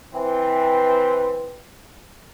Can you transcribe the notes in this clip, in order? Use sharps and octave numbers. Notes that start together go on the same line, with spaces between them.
E3 C4